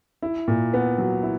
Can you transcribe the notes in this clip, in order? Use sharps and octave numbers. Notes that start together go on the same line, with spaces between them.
E4
A#2
B3
F#3
E4